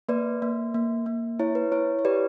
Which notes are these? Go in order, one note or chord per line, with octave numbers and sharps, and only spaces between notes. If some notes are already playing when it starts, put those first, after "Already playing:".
A#3 B4 D5
A#3
A#3
A#3
E4 C#5
B4
E4 C#5
C#5
G4 B4 D5